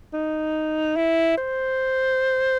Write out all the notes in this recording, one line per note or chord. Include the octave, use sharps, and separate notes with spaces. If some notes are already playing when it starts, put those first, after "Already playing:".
D#4
E4
C5